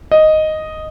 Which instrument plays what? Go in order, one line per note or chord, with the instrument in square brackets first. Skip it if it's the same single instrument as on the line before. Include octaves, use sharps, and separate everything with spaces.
[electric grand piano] D#5